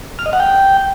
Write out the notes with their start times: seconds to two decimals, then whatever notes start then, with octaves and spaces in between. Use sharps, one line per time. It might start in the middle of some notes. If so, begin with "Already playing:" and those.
0.19 F6
0.26 D#5
0.33 F#5
0.40 G5